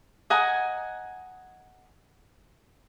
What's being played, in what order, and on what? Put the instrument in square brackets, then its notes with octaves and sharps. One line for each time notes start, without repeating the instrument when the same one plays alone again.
[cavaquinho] D#5 F#5 G#5 A#5